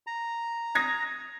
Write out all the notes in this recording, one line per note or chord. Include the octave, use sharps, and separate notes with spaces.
A#5
D#6 G#6 A#6